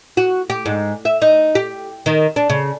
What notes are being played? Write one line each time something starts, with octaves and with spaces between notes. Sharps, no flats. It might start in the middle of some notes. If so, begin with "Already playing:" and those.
F#4
G4
G#2
E5
D#4
G4
D#3
D4
C#3